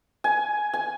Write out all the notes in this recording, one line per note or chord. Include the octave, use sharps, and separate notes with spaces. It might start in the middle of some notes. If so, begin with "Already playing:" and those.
G#5
G#5